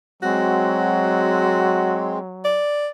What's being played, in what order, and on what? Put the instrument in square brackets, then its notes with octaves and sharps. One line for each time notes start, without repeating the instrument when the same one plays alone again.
[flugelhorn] F#3 [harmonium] G#3 C4 [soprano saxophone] F#4
[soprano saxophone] D5